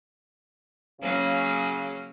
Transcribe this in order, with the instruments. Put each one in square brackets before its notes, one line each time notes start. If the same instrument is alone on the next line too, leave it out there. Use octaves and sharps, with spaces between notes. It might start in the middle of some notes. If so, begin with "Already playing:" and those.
[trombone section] C#3 [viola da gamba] F#3 A#3 C#4